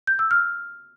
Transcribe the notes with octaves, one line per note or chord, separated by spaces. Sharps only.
G6
E6
F6